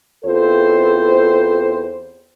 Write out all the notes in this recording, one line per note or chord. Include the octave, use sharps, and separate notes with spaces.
E2 C4 F4 A4 C5